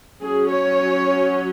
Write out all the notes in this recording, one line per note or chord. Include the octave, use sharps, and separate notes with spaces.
F#3 C#4 G#4
C#5